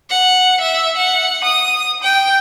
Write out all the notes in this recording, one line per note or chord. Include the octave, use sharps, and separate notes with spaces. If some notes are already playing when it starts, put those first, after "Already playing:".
F#5
E5
F#5
D#6
G5